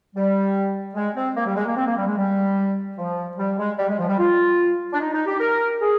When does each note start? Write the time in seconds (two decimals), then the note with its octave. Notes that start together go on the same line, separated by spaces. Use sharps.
0.15 G3
0.95 G#3
1.15 C4
1.36 A#3
1.46 G3
1.56 G#3
1.66 A#3
1.76 C4
1.86 A#3
1.97 G3
2.06 G#3
2.17 G3
2.98 F3
3.38 G3
3.58 G#3
3.78 G3
3.88 G#3
3.99 F3
4.08 G3
4.19 F4
4.93 D4
5.00 D#4
5.13 D#4
5.26 G4
5.40 A#4
5.80 G#4